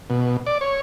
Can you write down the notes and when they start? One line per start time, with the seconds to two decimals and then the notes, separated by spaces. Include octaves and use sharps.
0.10 B2
0.46 D5
0.61 C#5